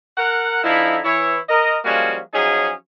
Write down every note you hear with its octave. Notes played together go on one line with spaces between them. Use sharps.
A#4 F#5
D3 F3 D#4 E4
E3 E4 C#5
A#4 D#5
F3 G3 G#3 A#3 C#4 F#4
F3 F#3 C#4 D#4 G#4